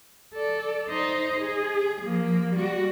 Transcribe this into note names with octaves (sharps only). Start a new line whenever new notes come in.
A4 D5
D#4 C5
G#4
F3 A#3
G3 F#4